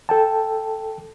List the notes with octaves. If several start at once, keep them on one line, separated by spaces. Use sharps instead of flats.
A4 G5 A5